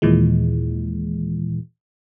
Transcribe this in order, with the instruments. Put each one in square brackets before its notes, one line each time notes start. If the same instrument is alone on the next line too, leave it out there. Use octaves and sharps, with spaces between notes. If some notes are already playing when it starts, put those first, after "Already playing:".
[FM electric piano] D#2 A#2 E3 G#3